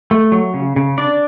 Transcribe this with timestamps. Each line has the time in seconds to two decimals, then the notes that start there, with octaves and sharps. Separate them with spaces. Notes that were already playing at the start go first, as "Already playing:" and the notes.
0.11 A3
0.32 F#3
0.54 C#3
0.76 C#3
0.98 D4 D5